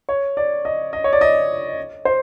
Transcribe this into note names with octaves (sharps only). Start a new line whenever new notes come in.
C#5
D5
D#5
D#5
C#5
D5
D#5
C5